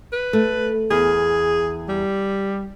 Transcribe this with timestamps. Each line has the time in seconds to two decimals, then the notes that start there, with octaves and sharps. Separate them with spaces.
0.12 B4
0.33 A3
0.91 E2 G#4
1.89 G3